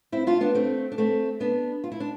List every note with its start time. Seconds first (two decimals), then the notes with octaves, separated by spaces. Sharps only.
0.12 C4 E4
0.27 D4 F4
0.41 B3 D4
0.55 A3 C4
0.92 D4
0.98 A3 C4
1.40 B3 D4
1.84 F4
1.92 E4
2.00 D4